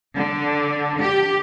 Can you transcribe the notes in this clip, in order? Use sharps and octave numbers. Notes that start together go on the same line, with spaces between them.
D3
G4